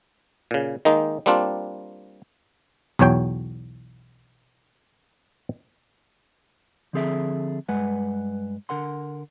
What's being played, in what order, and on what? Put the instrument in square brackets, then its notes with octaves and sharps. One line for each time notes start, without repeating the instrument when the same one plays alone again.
[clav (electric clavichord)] A#2 C#3
D#3 G#3 A#3 D#4
G3 A#3 C4 D4 F4
B1 E2 F#3 C#5 G5
[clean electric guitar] D3 F3 C4 G#4 A4 E5
G2 G#3 B4 F#5 G#5
D3 A#4 F#5 C6